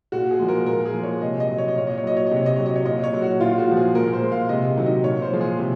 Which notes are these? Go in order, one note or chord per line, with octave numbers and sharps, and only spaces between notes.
A#2 F#4
G#4
F3 G#3
A#4
A#2 A#4
G#4
F3 G#3
C#5
C3 D#5
D#5
F#3
C#5
D#5
A#2 C#5
D#5
C#5
F#3 D#5
C#5
C3 D#5
C#5
D#5
F#3 C#5
D#5
C#5
A#2 D#5
C#5
F#3
F#4
A#2 F4
F#4
F3 G#3
G#4
A#2 A#4
C5
G#3
F5
C3 D#5
D#3 F#3
D#5
A#2 C#5
C5
F3 G#3
G#4
C3